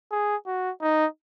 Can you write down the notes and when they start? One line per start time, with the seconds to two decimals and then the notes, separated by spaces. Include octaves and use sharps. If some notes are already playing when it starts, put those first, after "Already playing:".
0.12 G#4
0.47 F#4
0.82 D#4